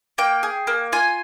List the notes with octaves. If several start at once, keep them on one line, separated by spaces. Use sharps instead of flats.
A#3 G5
G#4
A#3
F4 G#5